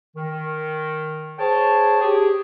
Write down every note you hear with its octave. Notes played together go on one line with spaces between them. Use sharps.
D#3
G#4 C5 C#5 G5 A5
G4 G#4